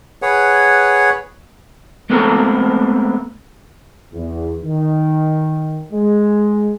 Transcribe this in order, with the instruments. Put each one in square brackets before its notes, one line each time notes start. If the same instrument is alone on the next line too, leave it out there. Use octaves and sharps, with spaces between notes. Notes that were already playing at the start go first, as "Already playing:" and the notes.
[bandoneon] G#4 B4 C#5 F#5
[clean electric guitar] G#3 A3 B3 C4 A4 A#4
[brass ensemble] E2
D#3
G#3